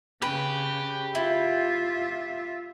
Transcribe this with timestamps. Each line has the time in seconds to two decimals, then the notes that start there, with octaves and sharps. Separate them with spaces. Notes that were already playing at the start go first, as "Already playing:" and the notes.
0.22 C#3 G4 B4 G5
1.15 E4 F4 E5